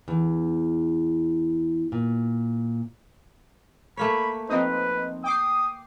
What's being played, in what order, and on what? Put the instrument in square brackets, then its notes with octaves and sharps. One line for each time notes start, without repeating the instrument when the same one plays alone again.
[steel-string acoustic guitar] E2
A#2
[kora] A3 A#3 C#5 [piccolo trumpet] B5 [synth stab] B6
[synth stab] F3 C4 D#4 [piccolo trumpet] B4
[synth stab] G5 D6 C7 [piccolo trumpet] D#6